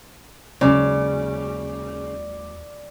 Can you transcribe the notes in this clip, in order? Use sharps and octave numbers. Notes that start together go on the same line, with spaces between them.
D#2 C#3 F#3 G#3 D5